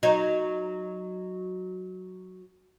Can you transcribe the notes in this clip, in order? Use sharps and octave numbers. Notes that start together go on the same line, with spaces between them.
F#3 D#4